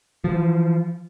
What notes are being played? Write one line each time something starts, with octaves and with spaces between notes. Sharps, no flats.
E3 F3